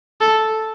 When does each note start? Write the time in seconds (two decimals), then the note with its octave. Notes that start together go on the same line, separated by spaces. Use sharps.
0.21 A4